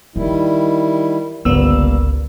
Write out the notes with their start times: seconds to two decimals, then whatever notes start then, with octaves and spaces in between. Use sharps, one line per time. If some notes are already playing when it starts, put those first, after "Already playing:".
0.16 D#3 E3 G3 E4
1.45 G1 C#2 G3 A#3 B3 E6